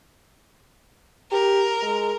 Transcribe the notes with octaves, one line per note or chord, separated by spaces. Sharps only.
G4 A#4
G#3